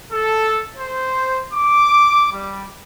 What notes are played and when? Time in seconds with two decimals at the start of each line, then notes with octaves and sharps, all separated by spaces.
0.12 A4
0.77 C5
1.54 D6
2.33 G3